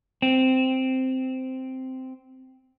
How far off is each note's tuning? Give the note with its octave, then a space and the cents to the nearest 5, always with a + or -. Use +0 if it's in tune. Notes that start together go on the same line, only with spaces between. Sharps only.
C4 -5